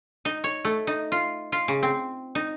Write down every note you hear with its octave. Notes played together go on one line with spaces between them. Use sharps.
D#4
C#5
A3
D#4
F4
F4
C#3
C4
D#4